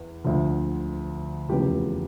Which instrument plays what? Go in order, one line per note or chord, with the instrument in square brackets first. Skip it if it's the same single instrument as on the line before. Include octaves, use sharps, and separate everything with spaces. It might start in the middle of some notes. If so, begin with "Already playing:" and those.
Already playing: [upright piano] E2
D2 D3 F3
F1 E2 C#3 F3 G4